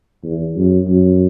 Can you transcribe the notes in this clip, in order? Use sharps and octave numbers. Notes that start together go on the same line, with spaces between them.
E2
F#2
F#2